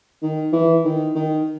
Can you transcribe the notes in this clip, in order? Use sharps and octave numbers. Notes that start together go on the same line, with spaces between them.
D#3
E3
D#3
D#3